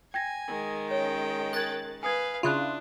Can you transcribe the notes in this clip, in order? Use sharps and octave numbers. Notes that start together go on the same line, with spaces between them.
G5 G#5 G#6 A#6
D#3 G#3
C#4 C#5 G5
A#4 F#6 G#6 A6
B4 F5 G#5 D#6 G#6
C#3 D4 E4 F4 E5 D#6 F#6